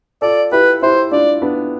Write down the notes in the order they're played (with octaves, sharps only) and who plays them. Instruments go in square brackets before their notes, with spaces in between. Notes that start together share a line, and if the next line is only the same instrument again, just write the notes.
[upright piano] F4 A4 [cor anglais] D5
[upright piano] E4 G4 [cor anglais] B4
[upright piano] E4 G4 [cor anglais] C5
[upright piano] D4 F4 [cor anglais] D5
[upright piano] B3 D4